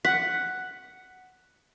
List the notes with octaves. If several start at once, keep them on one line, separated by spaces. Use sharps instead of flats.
F#5 B6